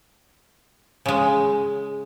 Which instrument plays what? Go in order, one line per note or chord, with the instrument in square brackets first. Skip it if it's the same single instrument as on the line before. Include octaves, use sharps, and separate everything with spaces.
[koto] C#3 G#3